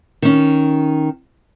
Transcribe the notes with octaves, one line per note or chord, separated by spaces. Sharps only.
D#3 C#4